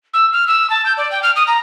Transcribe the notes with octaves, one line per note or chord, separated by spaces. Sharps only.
E6
F6
E6
A5
G6
D5
G5
F6
D#6
A#5